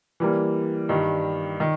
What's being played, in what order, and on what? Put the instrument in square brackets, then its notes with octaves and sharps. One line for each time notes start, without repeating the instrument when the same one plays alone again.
[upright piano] E3 G3 A#3
G2 D#3 G3
D#3